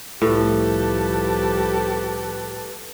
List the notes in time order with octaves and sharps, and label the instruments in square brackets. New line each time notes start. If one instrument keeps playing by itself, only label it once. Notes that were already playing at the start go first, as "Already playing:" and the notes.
[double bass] C2 F3 [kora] A2 [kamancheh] G4 A4 [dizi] B4